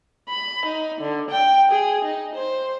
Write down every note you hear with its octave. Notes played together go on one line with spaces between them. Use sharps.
B5
D#4
D3
G5
G#4
D#4
C5